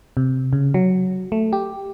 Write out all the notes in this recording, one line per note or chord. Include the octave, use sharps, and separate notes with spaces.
C3
C#3
F#3
A3
G4